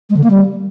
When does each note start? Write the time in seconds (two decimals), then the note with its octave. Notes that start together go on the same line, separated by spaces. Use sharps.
0.10 G#3
0.17 D3
0.24 A#3
0.30 G3